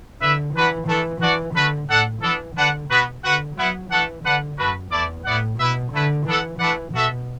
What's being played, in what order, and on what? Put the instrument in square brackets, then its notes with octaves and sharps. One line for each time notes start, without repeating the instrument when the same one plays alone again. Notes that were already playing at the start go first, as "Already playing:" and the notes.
[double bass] D3 [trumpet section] E4 B4 E5
[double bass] E3 [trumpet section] D4 F#4 B4 F#5
[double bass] E3 [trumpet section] A3 D4 A4
[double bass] E3 [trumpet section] D4 F#4 D5 F#5
[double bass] D3 [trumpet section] A3 F#4 B4
[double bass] A2 [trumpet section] D4 A4 F#5
[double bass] E3 [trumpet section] B3 D4 A4
[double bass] D3 [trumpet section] D4 B4 F#5
[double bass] B2 [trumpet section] B3 F#4 B4
[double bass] D3 [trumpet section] F#4 B4 F#5
[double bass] F#3 [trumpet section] B3 E4 B4 F#5
[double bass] E3 [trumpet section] A3 D4 A4 F#5
[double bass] D3 [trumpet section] D4 B4 F#5
[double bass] F#2 [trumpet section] A3 F#4 B4
[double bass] E2 [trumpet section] A3 E4 D5
[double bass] A2 [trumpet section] B3 E4 D5 F#5
[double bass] B2 [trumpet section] E4 B4 E5
[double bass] D3 [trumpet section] A3 E4 B4
[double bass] E3 [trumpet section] B3 D4 A4 F#5
[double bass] E3 [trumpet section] A3 D4 B4 D5 F#5
[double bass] B2 [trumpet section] F#4 A4 E5